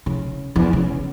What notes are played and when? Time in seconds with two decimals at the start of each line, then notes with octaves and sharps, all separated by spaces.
0.06 C#3
0.56 E2
0.73 C#3